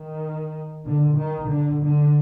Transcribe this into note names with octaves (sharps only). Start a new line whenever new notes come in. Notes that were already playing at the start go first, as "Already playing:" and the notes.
Already playing: D#3
D3
D#3
D3
D3